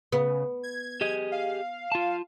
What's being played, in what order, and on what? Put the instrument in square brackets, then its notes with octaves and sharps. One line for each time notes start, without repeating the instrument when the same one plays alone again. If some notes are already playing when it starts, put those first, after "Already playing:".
[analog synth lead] C#3 [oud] B3
[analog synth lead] G#6
[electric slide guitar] G4 G#4 D#5
[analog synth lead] F5
[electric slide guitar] F4 A5